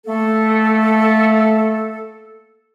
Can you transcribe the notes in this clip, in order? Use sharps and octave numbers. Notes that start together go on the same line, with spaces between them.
A3 A#3 A4